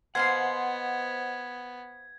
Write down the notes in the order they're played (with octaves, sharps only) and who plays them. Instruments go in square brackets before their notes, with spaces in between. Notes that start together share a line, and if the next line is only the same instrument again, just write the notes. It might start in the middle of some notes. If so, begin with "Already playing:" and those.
[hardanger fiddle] B3 [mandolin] C5 F5 C6 [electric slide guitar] D#5 F#5 [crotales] G#6